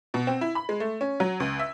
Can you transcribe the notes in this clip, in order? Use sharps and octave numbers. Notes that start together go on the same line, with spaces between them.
B2
C4
E4
B5
G#3
A3
C#4
F#3
C#2
E5